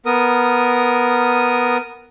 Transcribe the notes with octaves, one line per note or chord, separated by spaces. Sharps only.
B3 A#4 D#6